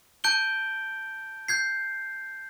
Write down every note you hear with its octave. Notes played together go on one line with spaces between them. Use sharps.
A5 G6 D7 G7
G6 G#6 C7